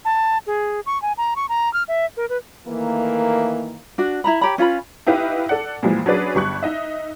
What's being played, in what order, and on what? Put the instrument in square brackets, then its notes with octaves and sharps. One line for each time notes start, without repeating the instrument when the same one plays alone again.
[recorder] A5
G#4
C#6
G#5
A#5
C#6
A#5
F6
E5
A#4
B4
[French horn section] D#3 E3 A3 A#3
[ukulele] D4 F#4
E4 A#5 B5
G4 C#5 A#5 B5
C#4 F4 B4 B5
[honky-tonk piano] D#4 E4 G4 B4 F5
A4 D5 F#5
A#2 E3 F3 G3 G#3
F#3 C#4 D4 G#4 B4 D5
G1 G3 C#6 F#6
D#4 D#5 E5